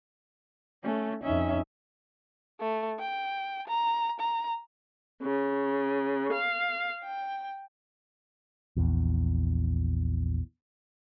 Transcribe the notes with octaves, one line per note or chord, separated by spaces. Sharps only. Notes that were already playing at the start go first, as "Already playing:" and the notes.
A3 C#4
F2 C#4 D#4 E5
A3
G5
A#5
A#5
C#3
F5
G5
A#1 E2